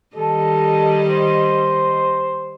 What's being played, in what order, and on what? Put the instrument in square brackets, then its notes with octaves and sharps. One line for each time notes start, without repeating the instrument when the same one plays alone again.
[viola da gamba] D#3 G3 D#5 [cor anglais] A4
[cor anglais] C5